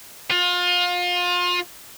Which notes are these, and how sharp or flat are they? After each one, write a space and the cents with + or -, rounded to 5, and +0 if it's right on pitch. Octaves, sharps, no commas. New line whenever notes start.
F4 +30